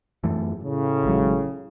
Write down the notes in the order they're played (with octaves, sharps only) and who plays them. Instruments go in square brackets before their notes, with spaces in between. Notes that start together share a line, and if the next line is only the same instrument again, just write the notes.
[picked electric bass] F#2 E3 A3
[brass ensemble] A2 C#3
[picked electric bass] G#1 G#2 F#3